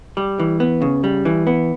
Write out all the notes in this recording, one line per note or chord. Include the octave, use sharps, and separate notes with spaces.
G3
E3
B3
C#3
G3
E3
B3